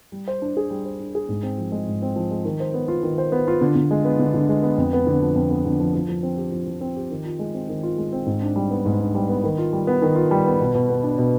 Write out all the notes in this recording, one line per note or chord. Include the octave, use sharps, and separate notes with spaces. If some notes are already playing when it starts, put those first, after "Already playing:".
G3
C5
D4
G#4
G3
C5
D4
G#4
G#2
C4
F3
G#3
G#2
C4
F3
G#3
D#3
C5
B3
F4
D#3
C5
B3
F4
D3
D3
G#3
B3
D3
D3
G#3
B3
F2
B3
D3
F3
F2
B3
D3
F3
F3
F3
C4
G4
F3
F3
C4
G4
D#3
F4
G#3
C4
D#3
F4
G#3
C4
G#2
D4
G3
B3
G#2
D4
G3
B3
D#3
F4
G3
B3
D#3
F4
G3
B3
B2
B2
B3
D4
B2